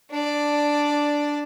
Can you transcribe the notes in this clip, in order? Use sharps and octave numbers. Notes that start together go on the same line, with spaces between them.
D4 D5